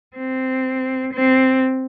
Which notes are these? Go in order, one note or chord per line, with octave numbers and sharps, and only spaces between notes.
C4
C4